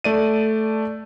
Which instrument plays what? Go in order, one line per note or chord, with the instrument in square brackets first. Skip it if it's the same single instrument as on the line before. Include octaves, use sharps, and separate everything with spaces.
[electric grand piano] A3 D5 D#7